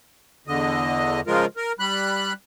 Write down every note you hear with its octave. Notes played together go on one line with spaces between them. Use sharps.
E2 D3 D#5
C#3 F3 G#3 F4 A#4
A#4
G3 B5 F#6